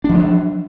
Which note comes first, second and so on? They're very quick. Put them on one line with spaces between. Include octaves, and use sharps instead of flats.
D4 F3 G#3 F#3